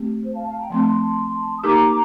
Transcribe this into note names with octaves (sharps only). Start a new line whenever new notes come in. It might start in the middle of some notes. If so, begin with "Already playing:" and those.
Already playing: A3 C4 G4
C5
F5 A5
F5 A5
G5 A#5
F3 A3 C4 A5 C6
D#6
A#3 D#4 G4 A#4 A#5 D6